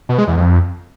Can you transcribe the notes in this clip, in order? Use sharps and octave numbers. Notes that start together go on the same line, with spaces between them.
B2
G#3
E2
F2